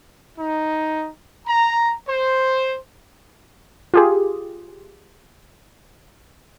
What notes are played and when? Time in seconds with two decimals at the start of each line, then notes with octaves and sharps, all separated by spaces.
0.39 D#4
1.47 A#5
2.08 C5
3.94 F4 G4 G#4